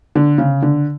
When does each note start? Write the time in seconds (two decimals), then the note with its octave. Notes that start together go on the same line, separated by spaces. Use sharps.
0.15 D3
0.38 C#3
0.62 D3